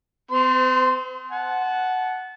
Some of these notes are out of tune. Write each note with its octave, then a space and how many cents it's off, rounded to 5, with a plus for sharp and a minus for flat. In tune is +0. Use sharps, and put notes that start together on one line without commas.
C4 -40 C5 -25 C6 -10
F#5 +0 A5 -30